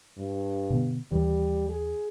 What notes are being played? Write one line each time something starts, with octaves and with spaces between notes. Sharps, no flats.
G2
B2 D3 B3
D#2 E3 G3
G#4